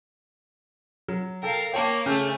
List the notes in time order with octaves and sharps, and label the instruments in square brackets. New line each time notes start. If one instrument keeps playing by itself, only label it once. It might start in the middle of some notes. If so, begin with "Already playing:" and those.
[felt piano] F#3
[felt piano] A4 G5 [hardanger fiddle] A#4 F5
[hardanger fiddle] A#3 C#5 [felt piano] G5 A5
[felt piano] C#3 F6 G6 [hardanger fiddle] A3 C#4